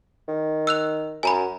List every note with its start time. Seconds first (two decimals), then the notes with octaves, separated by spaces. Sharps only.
0.28 D#3
0.67 E6 F#6 F7
1.23 F#2 G#5 A#5 B5